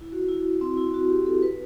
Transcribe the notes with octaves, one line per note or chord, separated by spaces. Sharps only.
E4
F#4
E4
C4
E4
F#4
G4
A4
B4